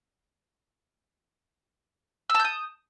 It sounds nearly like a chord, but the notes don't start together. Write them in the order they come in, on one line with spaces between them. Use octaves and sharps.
E6 A5 G6 D#6